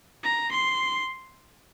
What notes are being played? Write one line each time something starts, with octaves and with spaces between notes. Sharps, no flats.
A#5
C6